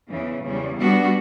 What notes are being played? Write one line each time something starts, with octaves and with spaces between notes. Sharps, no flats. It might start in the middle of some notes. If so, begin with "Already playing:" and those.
E2 C#3 E3
E2 C#3 G3
G3 B3 D4 F#4